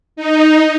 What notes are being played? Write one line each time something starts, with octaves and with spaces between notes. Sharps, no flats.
D#4